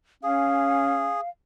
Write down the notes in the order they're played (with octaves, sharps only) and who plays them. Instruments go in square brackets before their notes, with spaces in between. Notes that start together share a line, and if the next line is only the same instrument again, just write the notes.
[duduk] C#4 [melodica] G#4 [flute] F5